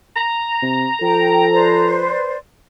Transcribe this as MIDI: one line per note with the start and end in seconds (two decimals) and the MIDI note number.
0.16 1.97 82
0.62 0.88 48
1.02 2.14 53
1.02 2.04 69
1.02 1.45 79
1.51 2.36 71
1.51 2.36 72
1.51 2.36 74